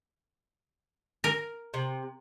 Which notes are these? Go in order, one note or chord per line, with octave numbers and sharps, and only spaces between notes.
A#4
C3